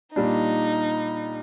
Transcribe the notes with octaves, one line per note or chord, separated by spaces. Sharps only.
A#2 G3 D4 D#4